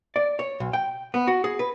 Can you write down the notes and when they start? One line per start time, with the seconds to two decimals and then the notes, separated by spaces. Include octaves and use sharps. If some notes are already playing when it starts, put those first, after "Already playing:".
0.16 D5
0.39 C#5
0.60 B1
0.73 G5
1.14 B3
1.27 F#4
1.44 G#4
1.59 B4